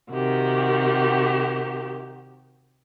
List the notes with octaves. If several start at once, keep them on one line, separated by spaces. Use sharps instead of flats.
C3 D#3 F#4 G4